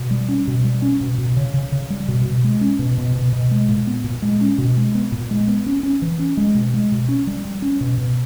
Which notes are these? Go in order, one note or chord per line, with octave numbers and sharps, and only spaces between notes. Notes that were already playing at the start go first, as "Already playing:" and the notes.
Already playing: B2
G3
C#4
B2
G3
C#4
B2
B2
C#3
C#3
C#3
G3
B2
B2
G#3
C#4
B2
B2
B2
B2
G#3
A#2
B3
A#2
G#3
C#4
B2
G#3
B3
A#2
G#3
B3
C#4
C#4
E3
C#4
G#3
B2
G#3
B2
C#4
G3
G3
C#4
B2
B2